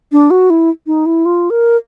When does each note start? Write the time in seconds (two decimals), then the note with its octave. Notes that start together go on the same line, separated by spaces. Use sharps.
0.12 D4
0.30 F#4
0.50 E4
0.87 D#4
1.06 E4
1.25 F4
1.50 A#4